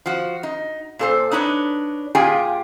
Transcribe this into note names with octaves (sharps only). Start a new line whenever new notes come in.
F3 F#4
D#4
A#2 A4 C5
D4 D#4 B4 C#5
A#2 F4 G4 G#4 G5 G#5